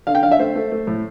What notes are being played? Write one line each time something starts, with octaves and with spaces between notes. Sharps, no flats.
D3 F5
G5
D3 F5
E5
A3 C5
A3
A3
A2